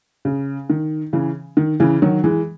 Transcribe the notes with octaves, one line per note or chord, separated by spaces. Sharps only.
C#3
D#3
C#3 E3
D#3
C#3 E3
D#3 F#3
E3 G#3